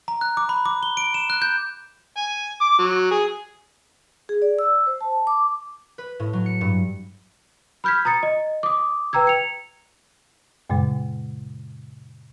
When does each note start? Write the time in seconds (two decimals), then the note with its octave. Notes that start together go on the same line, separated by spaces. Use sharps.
0.08 A#5
0.21 F#6
0.37 D6
0.49 B5
0.65 D6
0.83 G7
0.97 D7
1.14 E7
1.30 F#6
1.42 G6
2.17 G#5
2.61 D6
2.79 F#3
3.11 G#4
4.29 G#4
4.42 D5
4.59 E6
4.87 C5
5.01 A5
5.27 D6
5.98 B4
6.20 A2
6.33 F#3
6.46 C#7
6.61 G2
7.84 B5 F6 G6 G#6 B6
8.05 A#5 D#6 A6 C#7
8.23 D#5
8.63 D6 D#6
9.13 B4 G5 A#5 E6 G#6
9.27 C#7 F7
10.70 F#2 A#2 C#3 G#3